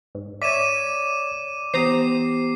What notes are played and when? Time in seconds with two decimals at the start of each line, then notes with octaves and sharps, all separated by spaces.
0.15 G#2
0.42 C#5 D5 E5 D6 D#7 E7
1.74 E3 B3 G4 C5 A#5 D#6 C7